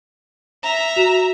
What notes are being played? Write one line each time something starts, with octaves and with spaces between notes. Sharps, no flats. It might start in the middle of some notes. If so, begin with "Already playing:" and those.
E5 A#5
F#4